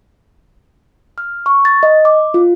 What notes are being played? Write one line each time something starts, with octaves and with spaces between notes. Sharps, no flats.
F6
C#6
A6
D#5
D6
F4